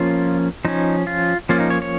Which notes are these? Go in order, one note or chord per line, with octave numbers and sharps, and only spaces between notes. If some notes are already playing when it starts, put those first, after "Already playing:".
Already playing: F3 A#3 C#4 F4
F3 C#4 D#4
F4
F3 A#3 C#4 F4
D#4
C#5
C#5